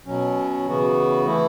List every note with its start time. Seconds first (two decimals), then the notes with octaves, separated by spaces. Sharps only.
0.06 B2 F#3 C#4
0.66 C#3 E3 B3 F#4
1.26 E3 A3 E4